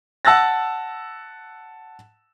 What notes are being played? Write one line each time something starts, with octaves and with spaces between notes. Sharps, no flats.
F#5 A5 E6 F#6 A6 A#6